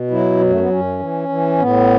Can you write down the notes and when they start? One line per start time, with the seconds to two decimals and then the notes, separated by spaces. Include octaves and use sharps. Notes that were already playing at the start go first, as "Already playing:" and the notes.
Already playing: B2
0.11 F#3 E4
0.41 F#2
0.50 A3
0.59 B3
0.70 F#2 C#4
0.99 E3
1.29 E3
1.58 A2 B3